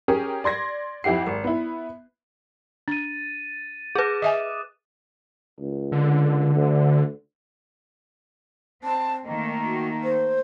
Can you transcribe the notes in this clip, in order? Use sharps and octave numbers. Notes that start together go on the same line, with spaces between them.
C#4 G4 G#4 A#4
D5 C6 G#6 A#6
F2 E4 G4 F#5 C7
G#1
B3 E4
D4 A6 D#7
G#4 B4 D6 F#6
D#5 E5 G#5 D#6
C#2
D3
D2
C4 A5
D#3 A3 A#3 D#5
F#4
C5